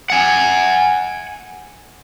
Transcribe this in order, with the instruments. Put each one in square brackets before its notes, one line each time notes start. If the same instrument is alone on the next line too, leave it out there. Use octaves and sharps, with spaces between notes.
[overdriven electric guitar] F#5 G#5